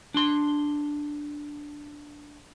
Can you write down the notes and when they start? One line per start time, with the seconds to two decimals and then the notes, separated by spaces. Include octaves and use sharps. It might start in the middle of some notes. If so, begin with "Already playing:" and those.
0.14 D4 C6